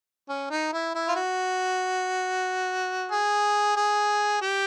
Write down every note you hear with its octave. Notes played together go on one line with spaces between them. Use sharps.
C#4
D#4
E4
E4
F4
F#4
G#4
G#4
G4